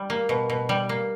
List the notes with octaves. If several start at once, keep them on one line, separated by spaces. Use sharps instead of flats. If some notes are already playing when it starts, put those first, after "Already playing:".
Already playing: G3
A#3
B2
B2
G3
A#3